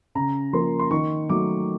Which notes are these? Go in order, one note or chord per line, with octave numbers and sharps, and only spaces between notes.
C#3 A#5
F3 A#3 C#4 C6
C6
D#3 C#6
F#3 A3 D6